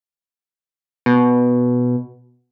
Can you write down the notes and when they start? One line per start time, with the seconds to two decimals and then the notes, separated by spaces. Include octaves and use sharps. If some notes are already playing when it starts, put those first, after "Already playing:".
1.06 B2